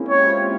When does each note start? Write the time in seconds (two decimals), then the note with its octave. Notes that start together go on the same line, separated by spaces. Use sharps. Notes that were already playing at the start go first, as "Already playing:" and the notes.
Already playing: G#3 A#3 C4 C#4 E4
0.09 G4 C#5
0.27 F4